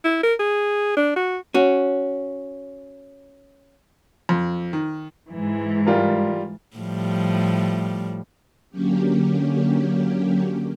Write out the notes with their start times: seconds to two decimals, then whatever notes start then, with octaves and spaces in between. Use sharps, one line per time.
0.04 E4
0.23 A#4
0.39 G#4
0.97 D4
1.16 F#4
1.54 C#4 F#4
4.29 F2
4.73 D#3
5.29 G#2 E3
5.87 G3 F4 A#4
6.76 A2 F3 G3
8.70 D3 F#3 A#3 C#4 G4